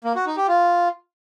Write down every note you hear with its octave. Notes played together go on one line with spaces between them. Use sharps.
A#3
F#4
D#4
G4
F4